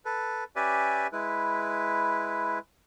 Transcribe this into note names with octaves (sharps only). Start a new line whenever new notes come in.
A4 B4
C#4 G4 B4 D5 E5 G#5
G#3 E4 B4